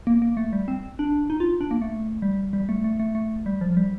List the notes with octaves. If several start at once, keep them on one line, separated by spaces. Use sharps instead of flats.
A#3
A#3
A3
G3
C4
D4
D#4
F4
D4
A#3
A3
G3
G3
A3
A3
A3
A3
G3
F3
G3